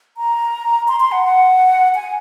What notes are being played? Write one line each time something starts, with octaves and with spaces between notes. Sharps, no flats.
A#5
C6
C6
F#5
F#5
G#5